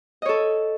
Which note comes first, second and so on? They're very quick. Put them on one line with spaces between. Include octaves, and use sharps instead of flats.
D#5 C#5 A4